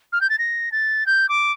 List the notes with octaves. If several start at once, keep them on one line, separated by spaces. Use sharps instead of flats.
F6
G6
A6
A#6
A6
G6
D6